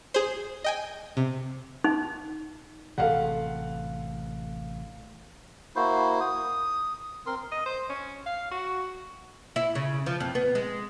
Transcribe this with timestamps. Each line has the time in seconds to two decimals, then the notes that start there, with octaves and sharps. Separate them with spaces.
0.14 G#4 C5
0.64 D#5 G5 G#5
1.17 C3
1.84 D#4
2.98 A1 C3 A4 F5 F#5
5.76 A#3 E4 F#4 C5
6.21 D#6
7.26 C4 A#4 C6
7.52 D#5
7.66 C5
7.90 C#4
8.26 F5
8.51 F#4
9.56 E4
9.75 C#3
10.06 F3
10.20 F2
10.35 B3
10.55 G#3